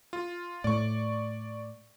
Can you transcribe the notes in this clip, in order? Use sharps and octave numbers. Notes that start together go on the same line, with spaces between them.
F4
A2 D5 C#6